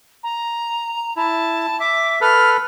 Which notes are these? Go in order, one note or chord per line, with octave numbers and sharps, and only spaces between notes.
A#5
E4 A5
E5 D6
A4 B4 F6